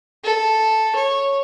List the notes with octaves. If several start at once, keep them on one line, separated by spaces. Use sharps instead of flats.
A4
C#5